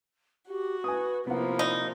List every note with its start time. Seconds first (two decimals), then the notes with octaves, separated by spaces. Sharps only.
0.48 F#4 G4
0.84 B4 G#5 D#6
1.27 C3 F3 A#3 B3 E4 F#5
1.59 D#4 D5